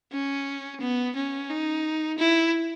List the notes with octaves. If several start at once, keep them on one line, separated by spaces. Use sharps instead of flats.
C#4
B3
C#4
D#4
E4